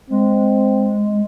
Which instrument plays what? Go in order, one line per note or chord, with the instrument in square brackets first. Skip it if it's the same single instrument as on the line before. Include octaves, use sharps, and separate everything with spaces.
[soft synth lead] G#3 [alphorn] C4